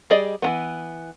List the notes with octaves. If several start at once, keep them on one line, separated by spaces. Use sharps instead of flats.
G3 G#4 D5 D#5
E3 F#3 B3